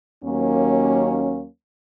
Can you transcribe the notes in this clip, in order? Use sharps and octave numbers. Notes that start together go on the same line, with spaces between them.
D#2 F#3 A#3 C#4